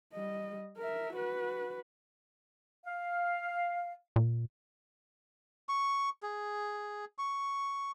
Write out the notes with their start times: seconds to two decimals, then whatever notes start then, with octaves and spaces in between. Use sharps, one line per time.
0.14 G3 D#5
0.77 A#4 E5
1.14 F#4 B4
2.85 F5
4.16 A#2
5.69 C#6
6.23 G#4
7.18 C#6